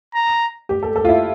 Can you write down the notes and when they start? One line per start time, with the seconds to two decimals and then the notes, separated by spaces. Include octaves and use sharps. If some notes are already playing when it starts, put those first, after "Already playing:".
0.15 A#5
0.69 G4
0.83 A4
0.96 A4
1.05 F4
1.09 E4